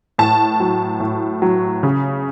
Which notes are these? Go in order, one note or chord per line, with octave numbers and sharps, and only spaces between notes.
A2 A5
F#3
A2
F#3
C#3